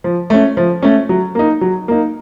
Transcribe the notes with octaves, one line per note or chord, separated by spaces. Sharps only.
F3
A3 C#4
F3
A3 C#4
F#3
A#3 D#4
F#3
A#3 D#4